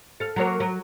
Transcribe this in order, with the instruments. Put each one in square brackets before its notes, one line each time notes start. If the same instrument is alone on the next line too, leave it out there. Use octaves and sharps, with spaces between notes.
[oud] A4 F5
F#3 A#3 C#5
F#3